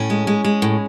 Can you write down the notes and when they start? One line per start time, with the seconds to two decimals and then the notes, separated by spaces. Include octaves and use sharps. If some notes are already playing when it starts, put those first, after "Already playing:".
Already playing: A2 C#4
0.10 G#3
0.27 G#3
0.44 G#3
0.62 A2